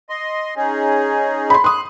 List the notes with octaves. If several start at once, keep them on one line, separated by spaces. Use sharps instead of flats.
D#5 C6
C#4 D#4 G#4
B5 C6
C6 D#6 F#6